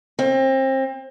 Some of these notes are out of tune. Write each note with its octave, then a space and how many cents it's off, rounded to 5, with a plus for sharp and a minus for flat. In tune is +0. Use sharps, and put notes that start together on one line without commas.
C4 +30